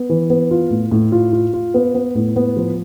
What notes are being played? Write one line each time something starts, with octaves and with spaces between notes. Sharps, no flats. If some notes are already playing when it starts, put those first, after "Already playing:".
Already playing: B3
E3
B3
F4
A2
A2
F4
F4
F4
B3
B3
A2
B3
F3